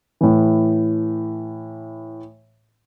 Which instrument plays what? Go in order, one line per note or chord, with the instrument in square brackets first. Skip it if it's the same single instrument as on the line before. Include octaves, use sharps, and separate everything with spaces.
[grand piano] A2 E3